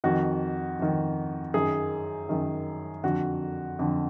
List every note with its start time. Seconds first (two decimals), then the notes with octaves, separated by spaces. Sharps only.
0.04 F2 D#3 F#4
0.79 F2 D#3
1.54 F#2 D#3 G#4
2.29 F#2 D#3
3.03 F2 D3 F#4
3.79 F2 D3